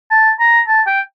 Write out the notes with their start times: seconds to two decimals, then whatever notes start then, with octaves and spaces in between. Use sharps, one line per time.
0.11 A5
0.40 A#5
0.68 A5
0.87 G5